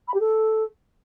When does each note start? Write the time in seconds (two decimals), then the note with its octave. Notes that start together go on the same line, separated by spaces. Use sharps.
0.08 B5
0.14 G4
0.20 A4